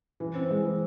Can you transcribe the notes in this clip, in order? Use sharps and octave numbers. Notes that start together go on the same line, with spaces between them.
E3
C4
G#3
E3